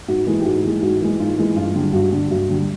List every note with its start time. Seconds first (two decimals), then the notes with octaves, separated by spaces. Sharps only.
0.08 G#2 F#4
0.27 E3 G#3
0.39 G4
0.45 G#2 F#4
0.64 E3 G#3
0.82 G#2 F#4
1.01 E3 G#3
1.20 G#2 F4
1.38 E3 G#3
1.56 G2 F4
1.75 D3 G3
1.93 G2 F#4
2.12 D3 G3
2.31 G2 F#4
2.49 D3 G3